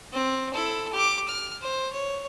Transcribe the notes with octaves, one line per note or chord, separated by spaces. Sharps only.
C4
E4 A4
G4 D6
F6
C5
C#5